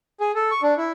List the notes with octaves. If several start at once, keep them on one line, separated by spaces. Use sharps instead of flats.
G#4
A4
C#6
D4
E4